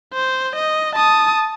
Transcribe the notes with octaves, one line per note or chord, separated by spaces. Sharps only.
C5
D#5
A5 D#6